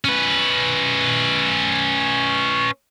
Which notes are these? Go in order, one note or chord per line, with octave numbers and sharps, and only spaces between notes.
C#4 B4